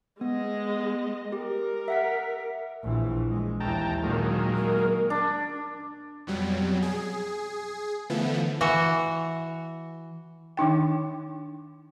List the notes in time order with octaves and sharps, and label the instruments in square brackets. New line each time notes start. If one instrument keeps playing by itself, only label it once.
[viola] G#3 D#5 [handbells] B3
[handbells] G4 [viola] A#4
[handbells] E5 F#5 B6
[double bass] A#1 E3
G#3
[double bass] D#2 E3 [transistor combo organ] G5 A5 A#5
[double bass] A#2 D#3 [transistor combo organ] F#3 G#3 A#3
[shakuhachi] A#4
[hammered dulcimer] D4
[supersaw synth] F2 B2 F#3 G3
G#4
D3 E3 F3 A3 B3
[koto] E3 F#4 F#5
[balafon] D#3 D4 D#4 G5